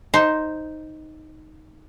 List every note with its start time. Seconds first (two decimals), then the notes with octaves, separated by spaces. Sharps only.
0.14 D#4 C5